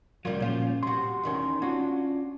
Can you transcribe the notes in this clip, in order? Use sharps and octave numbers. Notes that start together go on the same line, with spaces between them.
C#2 F#3 G3 A#3 F4
A#2 F3 C#4 F4
C3 F#4 C6
E2 D#3 C#4
C#4 D4 F4 F#4